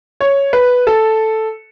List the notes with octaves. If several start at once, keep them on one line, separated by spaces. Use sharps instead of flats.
C#5
B4
A4